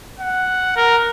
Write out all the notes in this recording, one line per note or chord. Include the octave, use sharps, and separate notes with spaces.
F#5
A#4